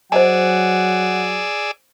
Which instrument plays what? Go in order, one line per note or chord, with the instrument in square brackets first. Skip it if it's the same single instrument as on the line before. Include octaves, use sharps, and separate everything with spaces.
[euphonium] F#3 [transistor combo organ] G#4 D5 E6 [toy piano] C5 D#5 G#5 [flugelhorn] F#5